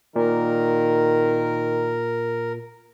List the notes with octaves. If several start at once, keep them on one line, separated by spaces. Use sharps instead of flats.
A#2 D#3 A#4